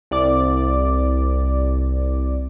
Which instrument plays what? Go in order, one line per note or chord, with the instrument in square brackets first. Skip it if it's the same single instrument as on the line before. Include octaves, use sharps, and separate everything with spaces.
[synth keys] C2 D5 D6